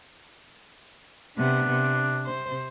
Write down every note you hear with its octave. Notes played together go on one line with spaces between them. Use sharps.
C3 B3 D4
C3
C3 C5